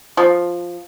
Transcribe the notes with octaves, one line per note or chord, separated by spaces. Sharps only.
F3